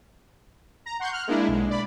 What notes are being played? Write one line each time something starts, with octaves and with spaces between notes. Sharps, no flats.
A#5
F#5 C6 C#6 G6
F6 F#6
G#3 A#3 D4 E4
B1 G#3
D5 B5